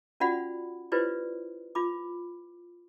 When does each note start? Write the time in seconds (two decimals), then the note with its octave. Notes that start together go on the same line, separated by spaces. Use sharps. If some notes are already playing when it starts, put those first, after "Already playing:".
0.20 C#4 F4 F#4 D5 F#5 B5
0.92 E4 F4 G4 B4 C5 D5
1.75 F4 B5 D6